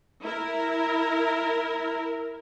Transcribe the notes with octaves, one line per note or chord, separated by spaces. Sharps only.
E4 A#4